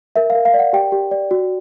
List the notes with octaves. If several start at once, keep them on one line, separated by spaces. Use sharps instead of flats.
A#4 E5
F5
A#4
F5
D5
F#5
G4 G5
G4
D5
F#4